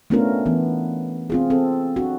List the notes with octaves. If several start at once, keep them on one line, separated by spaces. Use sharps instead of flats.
A3 B3 C#4 D4 F4 A#4
E3 B3
C4 F4 G#4
C4 A4
D4 F#4